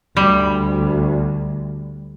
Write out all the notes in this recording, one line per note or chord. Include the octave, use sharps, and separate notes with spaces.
D2 G3